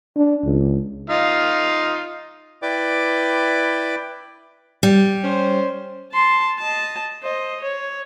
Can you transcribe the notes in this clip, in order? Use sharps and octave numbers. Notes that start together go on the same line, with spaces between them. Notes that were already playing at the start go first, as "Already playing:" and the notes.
D4
C#2
D#4 F4 F5
E4 B4 D5 G5 D6
G3
C#4 C5
A5 C6
D#5 A5
C5 D#5
C#5